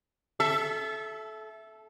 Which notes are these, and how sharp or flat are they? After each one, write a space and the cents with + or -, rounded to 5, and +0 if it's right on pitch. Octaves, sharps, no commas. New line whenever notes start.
A4 -25 E5 +5